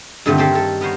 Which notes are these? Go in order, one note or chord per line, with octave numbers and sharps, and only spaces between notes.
G2 A#2 D3 D#3 A3 C4
G4 A4 C5 C#5 D#5 G5
A4 A#4
B3 A#4 C5 C#5